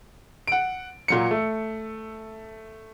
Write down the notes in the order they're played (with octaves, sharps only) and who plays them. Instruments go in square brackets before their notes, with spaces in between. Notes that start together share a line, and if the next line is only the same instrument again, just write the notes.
[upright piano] F#5 D7
A#2 F#3 C#7
A3